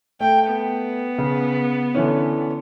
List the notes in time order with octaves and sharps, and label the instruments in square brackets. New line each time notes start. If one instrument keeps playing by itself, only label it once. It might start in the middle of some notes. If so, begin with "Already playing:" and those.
[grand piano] A3 [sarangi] G5
[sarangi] B3
[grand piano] C#3
D3 E3 C#4